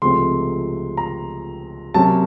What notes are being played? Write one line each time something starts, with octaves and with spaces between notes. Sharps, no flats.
C#2 C3 F3 A3 C4 C6
A#5
C3 F#3 A#3 C#4 A5